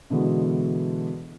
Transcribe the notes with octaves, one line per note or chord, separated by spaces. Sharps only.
B2 D3 E3 G#3 B3